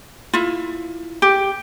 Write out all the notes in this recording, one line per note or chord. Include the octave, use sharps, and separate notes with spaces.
E4 F4
G4